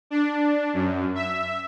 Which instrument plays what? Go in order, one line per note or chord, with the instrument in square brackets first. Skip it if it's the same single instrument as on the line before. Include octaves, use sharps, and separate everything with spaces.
[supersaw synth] D4
F#2
E5